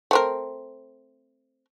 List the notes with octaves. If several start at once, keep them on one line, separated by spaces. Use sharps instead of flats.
A3 C4 A#4